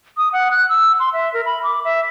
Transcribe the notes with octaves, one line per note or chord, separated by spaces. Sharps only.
D#6
F#5
F#6
E6
C6
E5
A#4
B5
D6
E5